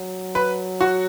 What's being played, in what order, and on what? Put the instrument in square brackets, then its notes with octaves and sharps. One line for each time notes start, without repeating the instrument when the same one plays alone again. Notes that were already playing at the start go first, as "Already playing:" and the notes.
Already playing: [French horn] F#3
[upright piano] B4
F#4